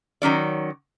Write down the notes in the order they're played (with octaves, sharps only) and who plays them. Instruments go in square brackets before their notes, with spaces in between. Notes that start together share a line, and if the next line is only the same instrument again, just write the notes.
[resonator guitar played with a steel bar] D#3 F#3 C#4 D5